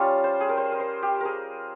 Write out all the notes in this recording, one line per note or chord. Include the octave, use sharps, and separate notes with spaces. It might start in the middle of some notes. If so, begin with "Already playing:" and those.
Already playing: G3 C#4 F4
C5
G#4
A#4
C5
A#4
C5
G4
G#4 A#4